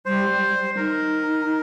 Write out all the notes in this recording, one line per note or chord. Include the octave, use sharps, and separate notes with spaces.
G3 C5
G3
G3
D#4 A#4